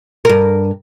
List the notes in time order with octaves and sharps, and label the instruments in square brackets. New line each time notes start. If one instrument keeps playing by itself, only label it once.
[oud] G2 A#4